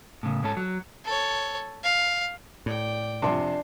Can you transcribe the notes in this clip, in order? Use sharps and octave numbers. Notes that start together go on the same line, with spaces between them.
A2 C#3
G#2 C#4 A4
F#3
A4 C#5
F5
A2 D5 G5
F2 C3 D4 C5 G#5